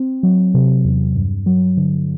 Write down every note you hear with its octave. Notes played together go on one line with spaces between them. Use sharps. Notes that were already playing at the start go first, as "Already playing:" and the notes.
Already playing: C4
F#3
C3
E2
G2
F#3
D3